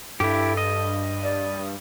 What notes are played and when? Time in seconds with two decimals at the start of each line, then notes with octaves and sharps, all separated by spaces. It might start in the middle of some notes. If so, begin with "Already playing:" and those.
0.20 G2 E4 G4 A4
0.57 D#5
1.23 D5